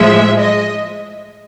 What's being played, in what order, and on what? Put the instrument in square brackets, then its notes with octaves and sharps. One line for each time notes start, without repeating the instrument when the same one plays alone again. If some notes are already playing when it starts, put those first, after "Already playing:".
Already playing: [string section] A2 F3 G#3 E5
D#5